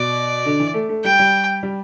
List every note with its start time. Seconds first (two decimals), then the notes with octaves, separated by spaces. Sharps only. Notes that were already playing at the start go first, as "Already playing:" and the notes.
Already playing: B2 D5
0.45 D3
0.60 E3
0.74 A3
0.89 A3
1.04 G3 G5
1.19 G3
1.63 G3